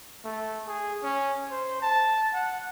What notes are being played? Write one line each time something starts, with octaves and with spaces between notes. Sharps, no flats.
A3
G#4
C#4
C5
A5
F#5